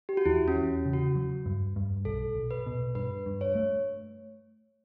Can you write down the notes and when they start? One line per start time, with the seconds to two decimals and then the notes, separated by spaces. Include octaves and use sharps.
0.09 G4
0.17 F#4
0.25 E2 E4
0.48 C#4
0.56 E2
0.85 C#3
0.93 F#4
1.15 F#3
1.46 G2
1.76 G2
2.05 B1 A4
2.35 B1
2.51 B4
2.66 B2
2.95 G2 B4
3.26 G2
3.41 C#5
3.55 A3